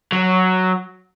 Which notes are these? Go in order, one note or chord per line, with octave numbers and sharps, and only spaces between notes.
F#3